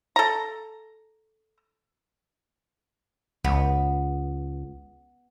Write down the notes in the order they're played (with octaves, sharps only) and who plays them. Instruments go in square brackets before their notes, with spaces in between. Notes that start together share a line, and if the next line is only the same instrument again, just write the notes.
[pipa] A4 A#5
[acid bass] C#2 [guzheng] B3